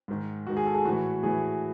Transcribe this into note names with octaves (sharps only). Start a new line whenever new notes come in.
G#2 D#3
G#2 D#3 F#4
G#4
A4
G#4
A2 E3 F#4
A2 E3 G#4